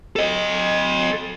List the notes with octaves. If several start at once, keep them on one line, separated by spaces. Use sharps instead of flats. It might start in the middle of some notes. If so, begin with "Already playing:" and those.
A4 D#5